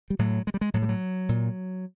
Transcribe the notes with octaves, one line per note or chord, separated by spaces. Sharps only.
G3
A2 F#3
G#3
G3
G#3
A2 F#3
G3
F#3
A#2